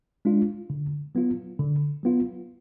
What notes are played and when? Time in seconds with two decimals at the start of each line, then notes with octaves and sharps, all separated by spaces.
0.25 G#3 D4 F4
0.70 D3
1.15 F#3 B3 F4
1.59 D3
2.03 F#3 B3 F4